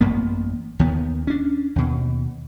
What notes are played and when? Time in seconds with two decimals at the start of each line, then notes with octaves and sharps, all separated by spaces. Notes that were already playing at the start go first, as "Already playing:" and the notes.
0.01 A1 F#2 A#3 B3
0.79 D#2 D#3 B3
1.27 C#4 D4
1.76 D#2 B2